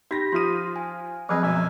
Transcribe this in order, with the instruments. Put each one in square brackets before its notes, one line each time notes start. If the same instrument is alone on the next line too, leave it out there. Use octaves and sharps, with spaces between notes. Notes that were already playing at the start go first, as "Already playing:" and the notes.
[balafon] D#4 [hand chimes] G4 B5 B6 [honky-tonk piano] G6 A#6
[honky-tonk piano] F3 F4 D#7 [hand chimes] C6 D#6
[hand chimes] F5 G#5
[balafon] F3 F#3 C4 [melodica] G#4 B4 [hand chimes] F6 G#6
[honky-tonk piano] F#2 B2 [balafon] F3 [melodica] E5 G#5